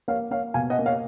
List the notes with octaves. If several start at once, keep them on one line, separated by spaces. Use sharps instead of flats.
A#3 C#5 F5
A#3 C#5 F5
B2 F5 G#5
D#5 F#5
A#3
C#5 F5